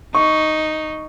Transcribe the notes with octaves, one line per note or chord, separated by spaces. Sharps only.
D#4 C#6